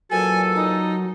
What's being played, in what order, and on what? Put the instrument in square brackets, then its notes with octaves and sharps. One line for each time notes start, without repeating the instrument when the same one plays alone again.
[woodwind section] E2 A#2 A4 [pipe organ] F#3 [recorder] G#5
[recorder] D#4